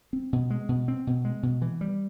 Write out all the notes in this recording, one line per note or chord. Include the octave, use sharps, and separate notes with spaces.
C4
B2
G#3
B2
C4
B2
G#3
B2
E3
G3